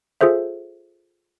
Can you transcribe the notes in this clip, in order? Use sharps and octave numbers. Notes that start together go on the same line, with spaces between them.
F4 G#4 A4 C5 E5